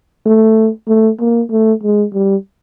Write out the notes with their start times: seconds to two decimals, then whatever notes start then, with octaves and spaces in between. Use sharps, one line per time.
0.26 A3
0.88 A3
1.20 A#3
1.51 A3
1.83 G#3
2.14 G3